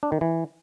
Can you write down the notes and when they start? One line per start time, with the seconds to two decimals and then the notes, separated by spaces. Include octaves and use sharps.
0.03 D4
0.12 D#3
0.21 E3